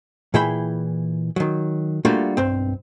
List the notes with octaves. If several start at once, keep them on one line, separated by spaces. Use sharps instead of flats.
A#2 E3 E4 G#4 G5 B5
D#3 F#3
G3 A3 A#3 D4 F4 F#4
B1 G2 C4